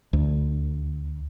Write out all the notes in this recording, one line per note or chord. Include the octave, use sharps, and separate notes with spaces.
D2